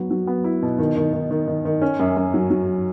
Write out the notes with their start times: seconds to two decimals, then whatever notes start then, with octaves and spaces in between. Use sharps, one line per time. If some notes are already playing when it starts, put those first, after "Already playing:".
Already playing: F#3 B3
0.11 F#3
0.27 B3
0.44 E4
0.62 B2
0.79 D#3
0.96 D#3
1.13 D#3
1.31 D#3
1.48 D#3
1.65 D#3
1.82 C#4
2.00 F#2
2.17 F#2
2.34 F#3
2.50 F#3